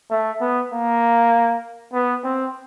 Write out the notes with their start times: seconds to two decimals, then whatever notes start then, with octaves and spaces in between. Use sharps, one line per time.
0.10 A3
0.41 B3
0.72 A#3
1.93 B3
2.24 C4